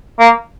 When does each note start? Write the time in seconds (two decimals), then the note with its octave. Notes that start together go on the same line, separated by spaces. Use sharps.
0.20 A#3